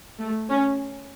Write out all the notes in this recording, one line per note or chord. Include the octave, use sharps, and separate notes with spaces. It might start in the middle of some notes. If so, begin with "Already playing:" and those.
A3
C#4